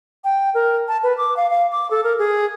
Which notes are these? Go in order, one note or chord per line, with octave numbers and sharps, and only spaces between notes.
G5
A#4
A5
B4
D6
F5
F5
D6
A4
A#4
G#4